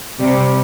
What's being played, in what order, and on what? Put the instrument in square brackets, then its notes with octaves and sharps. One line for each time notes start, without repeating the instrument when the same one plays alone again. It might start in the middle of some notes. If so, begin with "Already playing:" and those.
[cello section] C3 [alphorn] G3